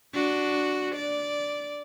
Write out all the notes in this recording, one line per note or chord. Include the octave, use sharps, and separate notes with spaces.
D4 F#4
D5